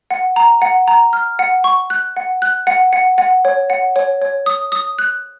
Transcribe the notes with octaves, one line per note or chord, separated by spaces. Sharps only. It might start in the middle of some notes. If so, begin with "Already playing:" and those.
F#5
A#5
F#5
A#5
F6
F#5
C#6
F#6
F#5
F#6
F#5
F#5
F#5
C#5
F#5
C#5
C#5
D#6
D#6
F#6